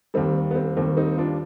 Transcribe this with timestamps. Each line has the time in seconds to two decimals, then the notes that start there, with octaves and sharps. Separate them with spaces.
0.14 D#2 D#3 G3 C4
0.51 B3
0.55 C4
0.77 D#2 D#3 G3 C4
0.97 C4 D#4
1.17 D4 F4